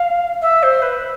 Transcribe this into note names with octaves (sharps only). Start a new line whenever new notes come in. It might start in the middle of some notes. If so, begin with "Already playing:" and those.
Already playing: F5
E5
C5
B4